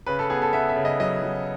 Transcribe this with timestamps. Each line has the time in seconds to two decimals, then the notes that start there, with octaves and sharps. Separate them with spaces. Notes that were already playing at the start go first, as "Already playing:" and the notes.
0.07 C#3 B4
0.19 A4
0.30 B3 G#4
0.42 A4
0.53 B3 E5
0.69 E5
0.76 C#3
0.85 D#5
1.00 F#3 D#5
1.23 F#3